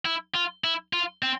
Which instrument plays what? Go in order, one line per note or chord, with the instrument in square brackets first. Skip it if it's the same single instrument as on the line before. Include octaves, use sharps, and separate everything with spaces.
[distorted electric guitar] E4
F4
E4
F4
C4